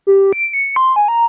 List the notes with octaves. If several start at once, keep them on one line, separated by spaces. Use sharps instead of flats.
G4
D7
C#7
C6
G#5
A#5